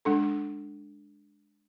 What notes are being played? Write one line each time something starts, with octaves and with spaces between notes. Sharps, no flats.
G#3 D4 A4